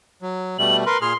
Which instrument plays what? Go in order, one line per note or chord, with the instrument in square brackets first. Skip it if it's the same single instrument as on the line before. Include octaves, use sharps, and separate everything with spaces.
[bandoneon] F#3
[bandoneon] B2 G3 A3 [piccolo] F#7
[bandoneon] A#4 B4 [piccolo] C6
[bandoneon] A#2 G#4 F6 [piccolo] C6